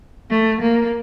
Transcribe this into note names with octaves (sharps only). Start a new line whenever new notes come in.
A3
A#3